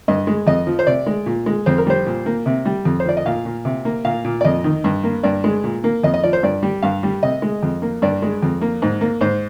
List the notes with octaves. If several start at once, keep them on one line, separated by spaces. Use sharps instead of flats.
G2 D#5
G#3
F2 D#5
F3
C5
C3 D5
G#3
A#2
G#3
F2 C5
A#4
G3 C5
A#2
A#3
C3
G3
F2
C5
F3 D5
D#5
A#2 F5
A#2
C3
A#3
A#2 F5
A#2
D5
F2 D#5
D#3
G2
A#3
G2 D5
G#3
A#2
A#3
F2 D#5
D#5
F3 D5
C5
G2 D5
G3
G2 F5
G3
C3 D#5
G#3
F2
A#3
G2 D5
G#3
F2
A#3
G#2
A#3
G#2 C5